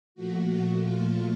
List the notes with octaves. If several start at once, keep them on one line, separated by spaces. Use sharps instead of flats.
A#2 F3 A3 F#4
F#4
F4